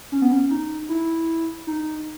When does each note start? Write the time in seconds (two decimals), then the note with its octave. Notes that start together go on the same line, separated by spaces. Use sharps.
0.12 C#4
0.22 B3
0.32 C#4
0.51 D#4
0.89 E4
1.67 D#4